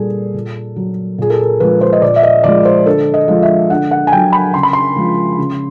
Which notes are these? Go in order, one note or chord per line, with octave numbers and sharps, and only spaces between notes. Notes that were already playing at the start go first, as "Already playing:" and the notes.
Already playing: A#2 G3 G#4 A4
A#2
F#3
A#2 G#4
A4
A#4
F3 G#3 B4
C5
D#5
A#2 D5
E5
D#5
F3 G#3 D5
C5
D3 A4
D#5
F3 G#3
E5
D3 F#5
F#5
G#5
F#3 G5
B5
C#3 C6
B5
C6
F3 G#3
C#3